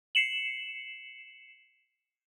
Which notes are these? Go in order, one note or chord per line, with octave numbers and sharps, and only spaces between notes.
C7 C#7 E7 F#7